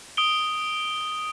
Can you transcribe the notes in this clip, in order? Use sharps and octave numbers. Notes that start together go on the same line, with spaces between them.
D#6 D7 G7